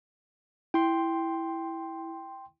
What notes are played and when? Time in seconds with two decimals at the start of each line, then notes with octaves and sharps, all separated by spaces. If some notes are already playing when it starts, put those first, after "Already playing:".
0.74 E4 G5 C6